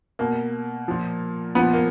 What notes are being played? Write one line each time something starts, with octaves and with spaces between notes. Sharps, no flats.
B2 A#3
A#2 F3
A#2 F3 B3
A#3